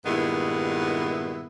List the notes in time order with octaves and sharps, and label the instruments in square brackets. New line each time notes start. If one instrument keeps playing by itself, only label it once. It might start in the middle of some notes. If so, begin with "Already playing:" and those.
[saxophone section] G2 A#2 D#3 G#3 B3 E4